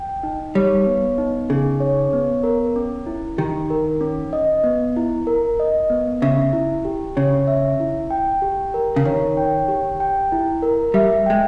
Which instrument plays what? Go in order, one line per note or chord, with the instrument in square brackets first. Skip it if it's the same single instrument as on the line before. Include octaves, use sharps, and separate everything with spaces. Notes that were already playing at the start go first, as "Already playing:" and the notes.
Already playing: [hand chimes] G5
D#4
[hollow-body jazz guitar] G3 [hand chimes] C#5
[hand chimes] B3
D#4
[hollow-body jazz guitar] C#3 [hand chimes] G#4
[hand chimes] C#5
B3
A#4
C#4
E4
[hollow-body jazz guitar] D#3 [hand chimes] G4
[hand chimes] A#4
C#4
D#5
B3
E4
A#4
D#5
B3
[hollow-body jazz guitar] C#3 [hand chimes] E5
[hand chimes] E4
G4
[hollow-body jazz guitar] C#3 [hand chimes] C#5
[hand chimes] E5
E4
G5
G4
A#4
[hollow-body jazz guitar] C#3
[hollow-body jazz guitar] D#3 [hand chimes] C#5
[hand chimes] G5
G4
G5
E4
A#4
[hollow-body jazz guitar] G3 [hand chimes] E5
[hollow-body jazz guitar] G#3 [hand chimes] G5